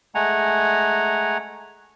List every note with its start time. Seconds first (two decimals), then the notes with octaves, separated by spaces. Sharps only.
0.15 G#3 A3 F#5 G#5 A#5